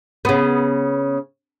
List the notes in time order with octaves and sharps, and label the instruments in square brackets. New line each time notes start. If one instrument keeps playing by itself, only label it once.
[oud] C#3 B3